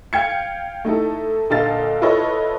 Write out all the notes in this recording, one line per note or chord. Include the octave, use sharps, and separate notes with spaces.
F5 G5 G#6 C#7
A3 D#4 E4 A4
A#2 D3 A4 D#5 F5 A6
E4 F4 A4 B4 C#5 D#5